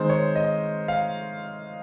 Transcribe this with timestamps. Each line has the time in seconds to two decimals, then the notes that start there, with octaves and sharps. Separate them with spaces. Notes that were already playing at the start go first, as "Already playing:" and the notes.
Already playing: D#3 G#3 C4 C5
0.09 C#5
0.36 D#5
0.88 F5